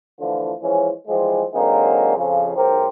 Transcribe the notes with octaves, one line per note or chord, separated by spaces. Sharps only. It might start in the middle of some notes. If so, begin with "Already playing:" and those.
D3 E3 F3 A3 F4
E3 F3 G#3 C#4
E3 F3 G3 G#3
D3 F#3 G#3 A#3 C4 D#4
F2 C#3 F3
B1 G#2 G4 A#4 C5